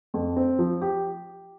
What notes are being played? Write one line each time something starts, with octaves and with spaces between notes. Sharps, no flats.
F2
C4
F3
G4